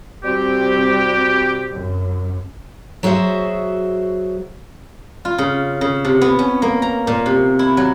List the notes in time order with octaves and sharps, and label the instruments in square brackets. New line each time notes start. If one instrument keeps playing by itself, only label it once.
[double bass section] C2 C4 [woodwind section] G3 F#4 G4
[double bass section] F#2
[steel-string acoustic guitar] F#3 F#4 G#4 C5 E5
[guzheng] F4
C#3
C#3
C3
B3
C#4
A#3
A#5
A#2
C3
E4
F#3